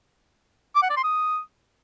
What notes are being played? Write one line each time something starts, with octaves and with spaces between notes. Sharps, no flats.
D6
F#5
D5
C6
D#6